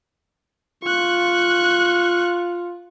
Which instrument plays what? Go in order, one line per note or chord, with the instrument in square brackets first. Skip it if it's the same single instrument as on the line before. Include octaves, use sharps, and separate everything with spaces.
[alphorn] F4 [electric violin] C#6 F#6